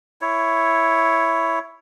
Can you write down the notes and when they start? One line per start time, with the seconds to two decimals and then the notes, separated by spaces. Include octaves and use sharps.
0.21 E4 C#5